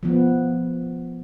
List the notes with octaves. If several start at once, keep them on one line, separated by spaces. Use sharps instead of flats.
F3 B3